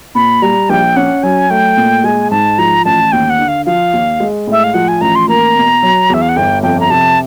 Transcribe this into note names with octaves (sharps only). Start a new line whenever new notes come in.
A#2 B5
G3 A#5
A#1 G5
C#4 F#5
F#3 G#5
A3 G5
A#2
G#3 G#5
G#2 A5
F3 A#5
A1 A5
D#2 G5
F#5
D3
F5
F3 F5
D#2
G#3
A2 E5
F5
F3 F#5
G#5
A1 A#5
C6
A#3 A#5
B2
F#3
E2 E5
F5
F#5
G1 G5
F2 G5
A#5
C3 A5